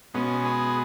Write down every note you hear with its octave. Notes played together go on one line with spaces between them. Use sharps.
B2 G#3 B3 C#4
G#4 B4